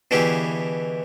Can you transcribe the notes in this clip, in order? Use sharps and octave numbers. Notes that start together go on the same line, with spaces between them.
B2 D3 E3 E4 G4 G#4